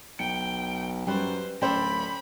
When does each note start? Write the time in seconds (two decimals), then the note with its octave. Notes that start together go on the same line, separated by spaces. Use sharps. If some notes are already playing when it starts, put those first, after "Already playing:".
0.19 B1 G5 C#7
1.07 F#2 G3 B4 C5 G5
1.62 D1 C#4 A4 C5 D5 G5 B5